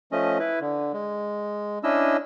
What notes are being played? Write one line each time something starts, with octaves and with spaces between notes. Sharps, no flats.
F3 A3 C#4 D#5
E4 B4
D3
G#3
C#4 D4 E4 D#5 E6